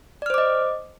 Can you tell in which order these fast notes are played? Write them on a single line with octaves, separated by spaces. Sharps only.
D5 F6 C5 D6 D#5